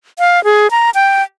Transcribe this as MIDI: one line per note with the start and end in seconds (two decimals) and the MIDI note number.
0.19 0.43 77
0.44 0.70 68
0.71 0.90 82
0.95 1.22 79